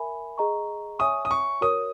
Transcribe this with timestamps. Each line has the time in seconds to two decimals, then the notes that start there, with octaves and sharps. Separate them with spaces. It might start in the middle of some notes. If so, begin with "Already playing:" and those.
Already playing: A#4 E5 G#5 B5
0.38 G#4 D#5 A#5 C#6
0.99 C#5 E5 G#5 C#6 D#6
1.25 D#6
1.31 C#6
1.61 F#4 A#4 C#5 D#6